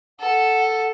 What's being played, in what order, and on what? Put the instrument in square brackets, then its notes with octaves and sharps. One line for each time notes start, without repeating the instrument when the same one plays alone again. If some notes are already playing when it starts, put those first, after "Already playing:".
[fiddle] A4 [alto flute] F#5